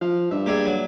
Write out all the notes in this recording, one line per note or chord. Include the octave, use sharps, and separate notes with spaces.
F3 F5
G2 E5
A#3 G4 G#4 D5 E5
F#3